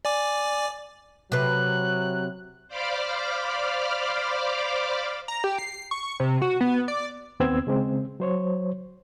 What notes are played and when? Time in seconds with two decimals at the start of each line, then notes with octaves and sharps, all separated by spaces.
0.05 D5 G#5 D6
1.32 C3 F#3 B4 F#6
2.68 C5 D5 F5 B5 D6 F6
5.28 A#5
5.44 G4
5.59 C7
5.91 C#6
6.03 C#6
6.20 C3
6.42 F#4
6.61 B3
6.88 D5
7.40 D#2 B3 C4 E6 G#6
7.67 C#3 G#3 C4
8.20 F#3 C5 C#5